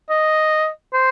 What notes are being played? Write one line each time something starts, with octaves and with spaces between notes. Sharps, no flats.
D#5
C5